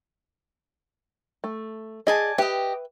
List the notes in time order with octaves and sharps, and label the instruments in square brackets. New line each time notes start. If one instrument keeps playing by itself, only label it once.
[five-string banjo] A3
[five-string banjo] G#4 D#5 [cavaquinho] D5 G#5 A5
[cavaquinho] G4 D#5 [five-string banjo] B4 E5 G5